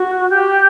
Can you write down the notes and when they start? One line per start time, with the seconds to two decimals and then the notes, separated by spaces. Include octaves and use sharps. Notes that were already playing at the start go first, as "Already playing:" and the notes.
Already playing: F#4
0.30 G4